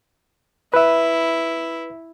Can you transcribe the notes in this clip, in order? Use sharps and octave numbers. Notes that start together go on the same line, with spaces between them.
E4 B4 E5